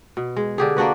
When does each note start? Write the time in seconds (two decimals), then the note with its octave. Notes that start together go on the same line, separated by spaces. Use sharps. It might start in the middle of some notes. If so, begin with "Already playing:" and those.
0.17 B2
0.37 G#3
0.58 D3 G4 G#4
0.76 A#3 D4 F#4 B4